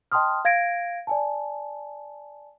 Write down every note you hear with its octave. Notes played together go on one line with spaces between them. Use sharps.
D#5 G5 A5 C6 D#6 F6
F5 G#6 A#6 D7
D5 G#5 A5